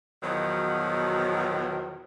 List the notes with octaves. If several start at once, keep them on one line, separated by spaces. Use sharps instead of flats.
E2 B2 D#3 F3 F#3